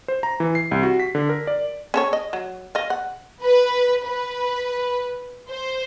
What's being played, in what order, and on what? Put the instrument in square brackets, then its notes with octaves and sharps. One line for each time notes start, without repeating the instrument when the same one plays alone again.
[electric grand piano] C5
A#5
E3
C7
C2
F#4
B6
D3
A#4
D5
[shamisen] C#4 A4 C#5
D#5
F#3
D#5 F5
F#5
[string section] B4
B4
C5